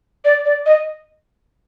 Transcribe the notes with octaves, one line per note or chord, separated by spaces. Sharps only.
D5
D5
D#5